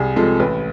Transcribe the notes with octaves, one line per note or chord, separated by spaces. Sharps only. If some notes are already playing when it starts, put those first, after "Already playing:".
Already playing: C2 G#4
C3 F3 G#3 A4
A1 B4